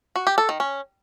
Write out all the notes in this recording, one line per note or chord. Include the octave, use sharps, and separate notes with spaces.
F#4
G4
A4
D#3
C#4